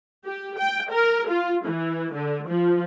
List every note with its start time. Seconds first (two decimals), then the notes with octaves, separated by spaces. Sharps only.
0.24 G4
0.57 G5
0.91 A#4
1.29 F4
1.65 E3
2.12 D3
2.47 F3